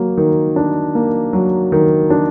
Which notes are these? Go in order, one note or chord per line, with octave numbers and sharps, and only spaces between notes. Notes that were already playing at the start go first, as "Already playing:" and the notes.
Already playing: F#3 A#3
D#3
D4
A#3
F#3
D#3
D4